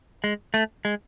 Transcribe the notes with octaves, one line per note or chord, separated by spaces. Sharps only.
G#3
A3
G#3